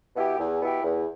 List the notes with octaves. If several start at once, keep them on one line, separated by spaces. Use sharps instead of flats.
B2 B3 E4 G4
E2
B2 B3 E4 G4
E2